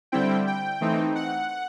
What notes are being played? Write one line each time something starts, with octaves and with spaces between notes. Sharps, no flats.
D3 G3 C4 E4 G5
G5
E3 A3 C4 D#4
F#5